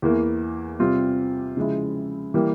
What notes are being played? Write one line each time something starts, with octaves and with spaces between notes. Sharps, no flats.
E2 E3 A#3
C3 G3 C4 F4
C#3 F3 G#3 E4
E3 G3 A#3